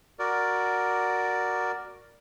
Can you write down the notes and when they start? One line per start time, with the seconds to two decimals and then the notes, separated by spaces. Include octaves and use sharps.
0.19 F#4 A#4 D5